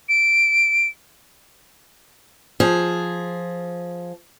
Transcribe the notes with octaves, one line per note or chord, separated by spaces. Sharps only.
D7
F3 G#4